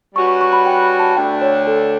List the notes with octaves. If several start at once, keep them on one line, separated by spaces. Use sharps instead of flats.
G3 C#4 F#4 B4 C#6
C#6
C#6
B5
G5
B5
A5
D2 D3 A3 D4 G5
C#5
A4